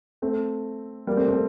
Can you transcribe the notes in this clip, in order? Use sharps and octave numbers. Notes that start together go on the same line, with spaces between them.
A3 C4
G3 A#3
A3 C4
A3 C4